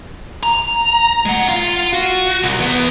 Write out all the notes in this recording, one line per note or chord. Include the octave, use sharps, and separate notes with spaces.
A#5
G#3 F#5
F4 F5
F#4
C2
E2 B3